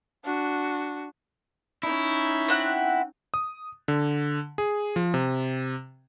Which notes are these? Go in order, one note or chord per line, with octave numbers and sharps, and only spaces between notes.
D4 F#4
C#4 D#4 E4
C4 F#5 F#6
D#6
D3
G#4
F3
C3